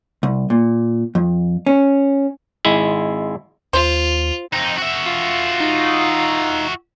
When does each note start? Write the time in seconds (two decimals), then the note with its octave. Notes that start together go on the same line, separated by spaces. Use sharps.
0.23 C2
0.50 A#2
1.15 F2
1.66 C#4
2.65 G#1 G#3 E4 E5
3.73 D#2 F4 C5
4.53 F2 C4 D#4
4.78 F#4 E5
5.06 F4
5.60 D#4